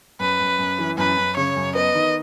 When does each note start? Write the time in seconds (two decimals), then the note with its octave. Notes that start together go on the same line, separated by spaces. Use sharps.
0.20 F#2 B4
0.40 F#2
0.58 F#2
0.79 E3
0.98 F#2 B4
1.17 F#2
1.37 C#3 C#5
1.56 F#2
1.75 B3 D#5
1.95 D#3